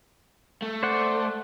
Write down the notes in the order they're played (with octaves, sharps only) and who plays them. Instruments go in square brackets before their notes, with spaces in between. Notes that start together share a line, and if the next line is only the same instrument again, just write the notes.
[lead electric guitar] A3
[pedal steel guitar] C5 D5 F#5